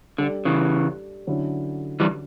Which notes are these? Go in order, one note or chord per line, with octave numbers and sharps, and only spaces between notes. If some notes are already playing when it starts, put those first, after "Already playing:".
D3 G3 D4 A4 D5
C#3 E3
D3 F#3 C#4 E4
E3 G3